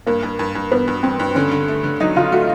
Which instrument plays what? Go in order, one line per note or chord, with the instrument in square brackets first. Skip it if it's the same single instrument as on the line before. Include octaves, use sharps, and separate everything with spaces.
[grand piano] G2 [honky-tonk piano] A#3
[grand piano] G2
G2
G2
[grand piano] G2 [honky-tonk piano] B3
[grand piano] G2
[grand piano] G2 [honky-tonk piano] C4
[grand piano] G2
[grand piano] D3 [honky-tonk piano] C#4
[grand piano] D3
A3
D3
[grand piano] F#3 [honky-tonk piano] D#4
[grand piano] D3 [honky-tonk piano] F4
[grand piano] A3 [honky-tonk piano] F#4